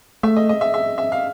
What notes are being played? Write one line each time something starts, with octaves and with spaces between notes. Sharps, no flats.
A3 E5
D#5
D#5
E5
E5
E5
F5